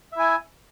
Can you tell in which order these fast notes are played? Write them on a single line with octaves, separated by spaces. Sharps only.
E5 E4 G#5